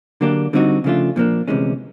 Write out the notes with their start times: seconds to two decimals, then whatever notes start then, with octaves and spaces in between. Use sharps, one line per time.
0.21 D3 F#3 A#3 D4 G4
0.53 D3 G3 C4 D#4 F#4
0.84 C#3 F3 A3 D4 F4
1.16 A#2 F3 A#3 D4
1.48 D2 C3 E3 G#3 C#4